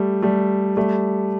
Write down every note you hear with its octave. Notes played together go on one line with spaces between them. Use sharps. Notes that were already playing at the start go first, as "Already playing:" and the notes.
Already playing: G3 A3
G3 A3
G3 A3